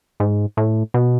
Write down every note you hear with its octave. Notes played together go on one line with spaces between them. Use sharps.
G#2
A2
B2